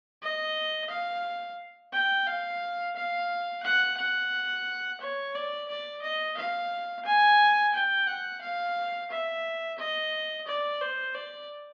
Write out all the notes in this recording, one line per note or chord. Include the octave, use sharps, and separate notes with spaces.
D#5
F5
G5
F5
F5
F#5
F#5
C#5
D5
D5
D#5
F5
G#5
G5
F#5
F5
E5
D#5
D5
C5
D5